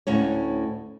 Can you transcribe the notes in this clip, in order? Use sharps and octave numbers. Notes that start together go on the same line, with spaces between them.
D2 A2 C#4 C#5